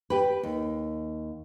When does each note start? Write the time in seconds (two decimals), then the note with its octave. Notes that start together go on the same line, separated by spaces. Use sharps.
0.10 G4 B4
0.43 D#2